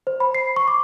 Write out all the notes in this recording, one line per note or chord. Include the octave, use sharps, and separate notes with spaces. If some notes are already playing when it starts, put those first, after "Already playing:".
C5
B5
C7
C#6
D6